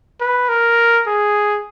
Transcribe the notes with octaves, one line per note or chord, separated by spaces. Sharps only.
B4
A#4
G#4